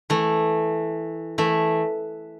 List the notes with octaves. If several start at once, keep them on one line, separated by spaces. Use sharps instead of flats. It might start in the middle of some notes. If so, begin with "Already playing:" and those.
E3 A3
E3 A3